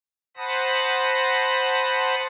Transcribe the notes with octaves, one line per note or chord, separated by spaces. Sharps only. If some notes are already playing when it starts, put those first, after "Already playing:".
C5 F#5 A5 B5 D#6 A#6